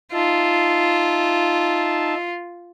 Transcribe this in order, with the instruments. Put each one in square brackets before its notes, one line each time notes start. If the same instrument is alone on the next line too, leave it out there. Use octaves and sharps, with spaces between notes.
[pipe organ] D#4 E5 A5 [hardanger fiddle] F4